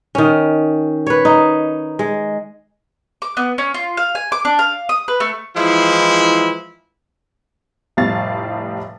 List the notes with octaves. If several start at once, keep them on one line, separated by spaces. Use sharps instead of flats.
D#3 C#4
B4 C#5
D#4
G#3
D6
B3
C#4
F4
F5
G#5
D6
D4
F5
D#6
B4
A3
E3 F3 G#3 E4
F1 A2 G3 F5 A6